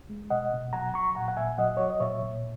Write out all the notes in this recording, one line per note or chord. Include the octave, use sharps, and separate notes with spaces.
G#3
B2 D#5 F#5
B2
F#3 F#5 A#5
F#3 A#5 C#6
A#2 F#5 A#5
F#5
A#2 E5 G#5
F#3 D#5 F#5
F#3 C#5
D#5
A#2 C#5 E5
A#2